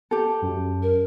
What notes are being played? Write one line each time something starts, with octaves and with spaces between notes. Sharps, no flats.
G4 A4
F#2
A#4